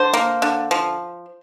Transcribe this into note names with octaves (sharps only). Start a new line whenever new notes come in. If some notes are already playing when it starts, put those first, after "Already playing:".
Already playing: D3 C5
A#3
D3
F3